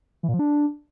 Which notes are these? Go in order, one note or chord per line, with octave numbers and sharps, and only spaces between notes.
E3
A#2
F3
D4